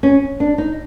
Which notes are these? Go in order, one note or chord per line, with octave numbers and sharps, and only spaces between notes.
C#4
D4
D#4